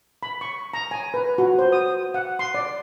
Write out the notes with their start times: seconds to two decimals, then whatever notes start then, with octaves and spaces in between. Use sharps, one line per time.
0.23 B5
0.41 C#6
0.74 A#5
0.91 G#5
1.14 B4
1.38 F#4
1.59 C5
1.72 D#6
2.14 F#5
2.39 C6
2.54 D5